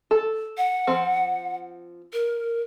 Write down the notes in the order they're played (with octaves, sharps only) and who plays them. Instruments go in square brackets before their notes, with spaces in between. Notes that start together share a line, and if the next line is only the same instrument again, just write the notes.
[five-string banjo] A4
[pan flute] F#5
[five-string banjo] F3 C4
[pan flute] A#4